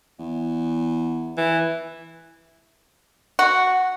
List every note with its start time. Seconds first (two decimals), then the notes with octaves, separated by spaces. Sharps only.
0.19 E2
1.37 E3
3.39 F#4